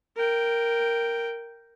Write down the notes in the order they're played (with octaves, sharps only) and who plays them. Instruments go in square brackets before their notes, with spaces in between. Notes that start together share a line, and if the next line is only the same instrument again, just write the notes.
[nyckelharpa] A#4 G5